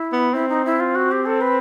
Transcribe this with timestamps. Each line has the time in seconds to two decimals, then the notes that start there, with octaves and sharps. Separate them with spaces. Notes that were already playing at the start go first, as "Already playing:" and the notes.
Already playing: E4
0.13 B3
0.33 C4 E4
0.49 D#4
0.65 E4
0.80 F4
0.95 F#4
1.11 G4
1.25 A4
1.41 B4